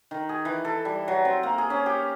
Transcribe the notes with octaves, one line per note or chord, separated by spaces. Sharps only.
D#3
G#4
E3
A4
G3
F#3
C4
A#3
G#4
C#4
G4